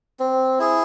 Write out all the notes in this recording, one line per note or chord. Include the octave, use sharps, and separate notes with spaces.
C4
E4 G#4